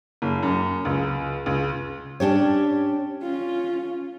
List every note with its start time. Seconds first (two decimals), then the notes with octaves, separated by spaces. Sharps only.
0.22 F#1
0.43 F#2
0.85 C#2
1.46 C#2
2.20 C#4 D4 G4 C#5
3.22 C#4 F4